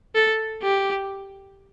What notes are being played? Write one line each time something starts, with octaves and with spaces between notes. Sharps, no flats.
A4
G4